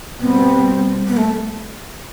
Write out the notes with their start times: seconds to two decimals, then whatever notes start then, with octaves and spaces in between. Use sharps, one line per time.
0.19 B2 G3 B3 C4
1.07 B3
1.17 A3